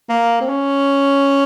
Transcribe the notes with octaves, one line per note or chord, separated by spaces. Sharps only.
A#3
C4
C#4